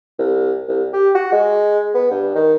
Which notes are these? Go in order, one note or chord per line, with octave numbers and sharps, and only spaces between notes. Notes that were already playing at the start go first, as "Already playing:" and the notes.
C2
C2
G4
F#4
G#3
B3
G2
D#3